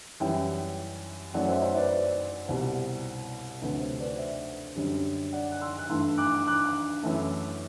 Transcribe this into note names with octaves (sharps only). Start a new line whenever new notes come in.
F#2 E3 G3 E5 G5
F#2 F#3 A3 D5 F#5
C5 E5
C5 E5
B4 D5
B4 D5
C5
C2 B2 G3 C5
D2 C3 F#3 A3 B4
C5
B4 D5
C5 E5
F#2 D3 G3
D5 F#5
F#6
C6 E6
F#6
G2 E3 A3 C6 E6
D6 F#6
D6 F#6
F#2 E3 A3